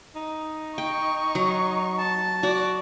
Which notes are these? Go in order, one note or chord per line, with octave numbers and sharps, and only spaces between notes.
D#4
G5 C#6
F#3
A5
F#4 D5